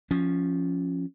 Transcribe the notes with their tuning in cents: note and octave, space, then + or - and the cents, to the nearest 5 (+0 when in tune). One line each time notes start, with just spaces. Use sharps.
F3 +0 C#4 +0